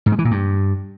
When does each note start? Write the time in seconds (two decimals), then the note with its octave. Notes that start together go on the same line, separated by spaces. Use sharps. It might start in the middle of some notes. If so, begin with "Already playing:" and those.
0.06 G#2
0.12 G#3
0.19 E3
0.25 A#2
0.31 G2